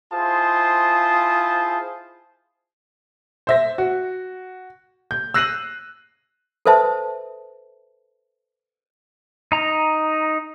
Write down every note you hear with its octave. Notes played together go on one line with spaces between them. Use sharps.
E4 F4 G#4 C5 A5 D#6
C5 E5 A#6
F#4
G6
E6 F#6 A#6 C7 D#7 F#7
A4 B4 C5 E5 A5
D#4 A#5